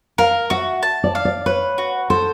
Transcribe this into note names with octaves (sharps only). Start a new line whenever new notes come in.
A#4 F5
F#4 E5
A5
D5
F5
D5
B4 C#5
F#4
A4 C5